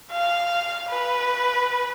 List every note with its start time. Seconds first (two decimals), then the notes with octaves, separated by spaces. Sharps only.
0.11 F5
0.89 B4